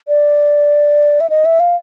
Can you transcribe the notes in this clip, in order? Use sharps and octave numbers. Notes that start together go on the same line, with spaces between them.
D5
E5
D#5
E5
F5